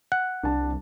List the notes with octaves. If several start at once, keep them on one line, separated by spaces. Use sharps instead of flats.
F#5
C2 D4 A5